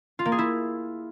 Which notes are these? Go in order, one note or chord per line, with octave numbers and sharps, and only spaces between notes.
F4
A#3
G#4
E4